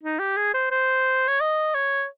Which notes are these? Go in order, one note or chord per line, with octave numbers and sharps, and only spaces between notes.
D#4
G4
G#4
C5
C5
C#5
D#5
C#5